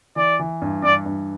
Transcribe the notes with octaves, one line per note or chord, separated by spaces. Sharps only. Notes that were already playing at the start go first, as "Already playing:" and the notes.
E3 D5
E3
G2
G2 D5
G2